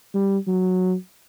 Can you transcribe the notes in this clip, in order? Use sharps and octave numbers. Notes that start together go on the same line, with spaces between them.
G3
F#3